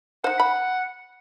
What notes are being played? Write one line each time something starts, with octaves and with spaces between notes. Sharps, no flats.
D#4 C5 F#5
B5